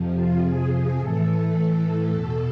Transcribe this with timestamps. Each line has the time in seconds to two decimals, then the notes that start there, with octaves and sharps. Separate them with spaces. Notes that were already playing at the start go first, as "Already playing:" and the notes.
Already playing: F2 C3 F3
0.13 F4
0.42 G#4
0.71 G#4
0.98 A2 E3 A4
2.12 E2 B2